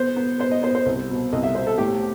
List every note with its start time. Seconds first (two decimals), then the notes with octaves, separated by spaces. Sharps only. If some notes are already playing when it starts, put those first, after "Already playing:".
Already playing: B3 C5
0.16 B3
0.39 B3 C5
0.51 D#5
0.63 B3 C5
0.75 C5
0.86 C2
1.10 B2
1.33 C2 D#5
1.43 E5
1.55 B2 C5
1.67 A4
1.78 A2 G4